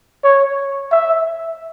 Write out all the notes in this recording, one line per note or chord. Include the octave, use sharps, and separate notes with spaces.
C#5
E5